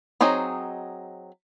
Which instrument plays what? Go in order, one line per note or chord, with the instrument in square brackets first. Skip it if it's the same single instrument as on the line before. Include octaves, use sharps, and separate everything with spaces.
[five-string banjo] F#3 C4 D#4 G#4 D#5